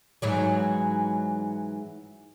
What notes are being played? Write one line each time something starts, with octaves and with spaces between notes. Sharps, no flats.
G#2 E3 F#3